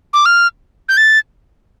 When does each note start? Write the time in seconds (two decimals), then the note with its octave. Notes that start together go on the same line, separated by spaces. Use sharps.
0.13 D6
0.25 F6
0.89 G6
0.97 A6